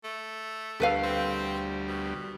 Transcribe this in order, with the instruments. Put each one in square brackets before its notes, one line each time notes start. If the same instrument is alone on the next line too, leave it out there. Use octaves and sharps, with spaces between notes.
[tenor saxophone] A3
[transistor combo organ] D2 G3 [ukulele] A4 B4 F5
[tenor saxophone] C4
B2